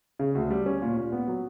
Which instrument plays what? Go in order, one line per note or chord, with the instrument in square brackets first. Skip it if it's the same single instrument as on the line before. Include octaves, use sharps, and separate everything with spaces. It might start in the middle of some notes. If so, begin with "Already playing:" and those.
[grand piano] C#3
D2
G3
C#4
A#2
A#2
B3
F#3